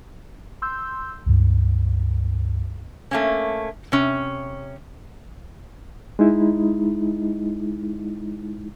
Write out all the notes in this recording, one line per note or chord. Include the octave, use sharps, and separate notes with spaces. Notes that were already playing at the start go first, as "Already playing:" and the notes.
C6 E6 G6
C#2 G2
A3 A#3 C#4
C3 C#4
G#3 D#4 E4